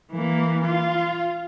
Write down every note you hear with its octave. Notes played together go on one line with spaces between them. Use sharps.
E3 A#3
F4